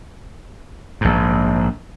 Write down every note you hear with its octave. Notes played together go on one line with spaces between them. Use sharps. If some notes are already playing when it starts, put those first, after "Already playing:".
A#1 G#2